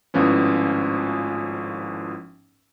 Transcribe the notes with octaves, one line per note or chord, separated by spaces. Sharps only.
G#1 A2 F3 B3 C#4